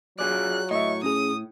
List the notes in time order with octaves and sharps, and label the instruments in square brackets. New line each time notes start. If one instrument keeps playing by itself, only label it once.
[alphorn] F#3 [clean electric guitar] F4 G#4 D5 [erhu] F#6
[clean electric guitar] A2 [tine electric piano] D#5 E5 [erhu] C#6
[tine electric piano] C#4 G#4 [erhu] D#6